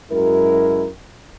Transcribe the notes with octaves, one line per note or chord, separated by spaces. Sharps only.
F#2 G#3 E4 F#4 A#4